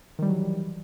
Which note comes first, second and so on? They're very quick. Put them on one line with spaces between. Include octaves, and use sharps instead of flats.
D#3 G3 E3 F#3